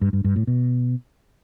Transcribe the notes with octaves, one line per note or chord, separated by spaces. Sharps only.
G2
G2
G2
A2
B2